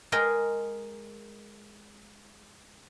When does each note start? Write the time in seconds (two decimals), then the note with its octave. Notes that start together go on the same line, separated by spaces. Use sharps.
0.12 G#3 G#4 A#4 D#5 G5